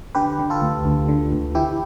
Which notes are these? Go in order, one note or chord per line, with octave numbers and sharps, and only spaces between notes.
D3 G4 B4
D3
F4 A4
D2
D2
D3
D2
E3 E4 G4